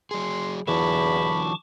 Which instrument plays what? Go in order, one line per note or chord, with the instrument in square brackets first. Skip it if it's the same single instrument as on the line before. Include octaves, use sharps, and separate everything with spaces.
[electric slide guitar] F#3 G#4 [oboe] C6
[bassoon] E2 [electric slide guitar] D3 E3 F#3 [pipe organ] A5 C#6 D6 [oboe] B5